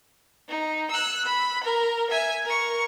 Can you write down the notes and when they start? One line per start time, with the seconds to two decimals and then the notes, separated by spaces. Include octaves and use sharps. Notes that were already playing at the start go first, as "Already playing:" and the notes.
0.48 D#4
0.91 E6 F#6
1.26 B5
1.64 A#4
2.10 E5 G#5
2.45 A#4 C#6